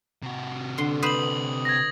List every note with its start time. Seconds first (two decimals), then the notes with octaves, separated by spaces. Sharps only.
0.23 C3 F#4
0.78 D3 C6
1.03 B4 C5 D#6 F#7
1.65 G#6 A#6